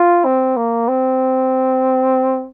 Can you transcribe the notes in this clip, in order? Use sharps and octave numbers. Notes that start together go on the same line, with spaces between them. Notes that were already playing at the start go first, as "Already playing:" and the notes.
Already playing: F4
C4
A#3
C4